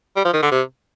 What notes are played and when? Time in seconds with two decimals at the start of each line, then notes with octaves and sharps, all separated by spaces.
0.16 G3
0.25 F3
0.33 D#3
0.43 D3
0.52 C3